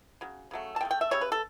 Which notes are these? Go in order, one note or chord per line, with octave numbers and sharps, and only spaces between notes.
C#3 F#3
C#3 F#3 A3
A5
C#3 F#3 A3 G5
G5
E5
C#3 G3 C#5
B4
A4